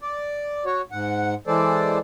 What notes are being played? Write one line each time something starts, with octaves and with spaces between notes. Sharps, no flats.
D5
F#4 C#5
G#2 F#5
E3 G#3 A4 C5 D5